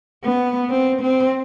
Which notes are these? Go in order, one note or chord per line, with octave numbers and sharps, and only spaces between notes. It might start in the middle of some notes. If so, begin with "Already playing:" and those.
B3
C4
C4